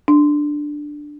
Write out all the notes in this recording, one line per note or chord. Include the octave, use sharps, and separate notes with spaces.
D4